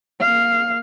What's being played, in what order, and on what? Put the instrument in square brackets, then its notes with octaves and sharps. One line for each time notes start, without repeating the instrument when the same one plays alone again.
[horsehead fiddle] A#3 F5